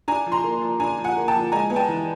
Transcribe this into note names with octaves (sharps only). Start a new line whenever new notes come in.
D4 G#5 A#5
F3
A#5 C6
A#3
F3
D4 G#5 A#5
F3
F#5 G#5
A#3
G5 A5
F3
G#3 G#5 A#5
B3 G#5
G5 A5
E3